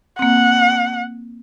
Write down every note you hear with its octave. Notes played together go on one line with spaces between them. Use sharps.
A#3 C4 F#5